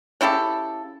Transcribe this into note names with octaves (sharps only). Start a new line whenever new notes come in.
C#3 E4 G4 A4